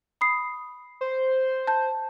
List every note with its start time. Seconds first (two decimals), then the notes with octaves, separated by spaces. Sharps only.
0.21 B5 D#6 C7
1.01 C5
1.67 A5 G6